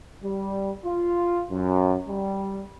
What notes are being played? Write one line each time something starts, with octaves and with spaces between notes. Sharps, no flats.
G3
F4
F#2
G3